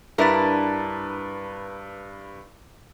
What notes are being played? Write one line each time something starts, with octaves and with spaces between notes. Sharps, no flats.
G2 D4 E4 A#4 B4 A6